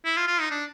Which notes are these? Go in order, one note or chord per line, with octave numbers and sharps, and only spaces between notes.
E4
F4
F4
D#4
D4